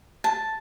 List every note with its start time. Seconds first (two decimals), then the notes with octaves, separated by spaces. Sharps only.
0.24 A5